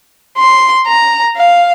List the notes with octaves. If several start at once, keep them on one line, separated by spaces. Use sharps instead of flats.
C6
A#5
F5